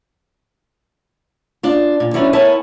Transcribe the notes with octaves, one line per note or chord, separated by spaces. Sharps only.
D4 F4
A#2
E3 F#3 B3 C#4 D4
B3 E4 A#4 C#5 G#5 A5